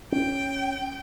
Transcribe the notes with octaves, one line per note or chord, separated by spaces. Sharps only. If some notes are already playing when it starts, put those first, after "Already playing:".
C#4 G5